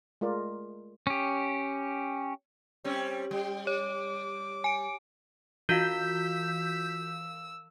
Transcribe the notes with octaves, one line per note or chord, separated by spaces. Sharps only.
G#3 A3 F4 A#4 D5
C#4 G4
G3 C4 C#4
G3 G5
C#5 D6
G#5 D7
E3 F4 F#4 F5 E6 G6 B6